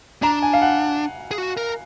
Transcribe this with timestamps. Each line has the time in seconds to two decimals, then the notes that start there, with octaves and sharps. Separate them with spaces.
0.22 D4 A#5
0.42 G#5
0.53 F5
0.62 F#5
1.31 G#4
1.38 F#4
1.57 A#4